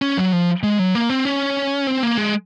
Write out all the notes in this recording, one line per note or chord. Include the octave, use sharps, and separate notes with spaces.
C#4
F#3
F3
G#3
F#3
A#3
C4
C#4
C4
A#3
G#3